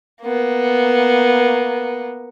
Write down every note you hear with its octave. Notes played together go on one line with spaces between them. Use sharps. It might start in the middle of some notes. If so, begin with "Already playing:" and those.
A#3 B3